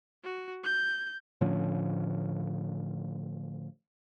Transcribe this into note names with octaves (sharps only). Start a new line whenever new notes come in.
F#4
G6
A2 D3 F3 C#4